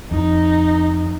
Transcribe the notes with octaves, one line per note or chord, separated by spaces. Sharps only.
F2 D#4